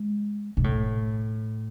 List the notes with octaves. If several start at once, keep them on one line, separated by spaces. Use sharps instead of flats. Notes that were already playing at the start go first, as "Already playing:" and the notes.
Already playing: G#3
B2
A2